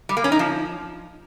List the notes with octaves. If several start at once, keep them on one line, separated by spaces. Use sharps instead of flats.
G3
A#3
C#4
D#4
F3